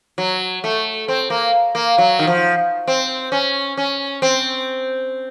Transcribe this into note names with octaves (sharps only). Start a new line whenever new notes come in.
F#3
A3
C4
A#3
A#3
F#3
D#3
F3
C4
C#4
C#4
C4